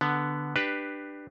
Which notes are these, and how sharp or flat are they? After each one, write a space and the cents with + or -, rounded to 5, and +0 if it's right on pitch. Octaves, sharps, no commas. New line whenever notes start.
D3 +0 B3 +0
D4 +20 G4 +0 B4 +0